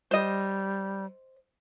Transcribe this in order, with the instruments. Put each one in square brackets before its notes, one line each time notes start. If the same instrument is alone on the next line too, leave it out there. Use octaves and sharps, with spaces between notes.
[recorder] G3 [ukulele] C5 D#5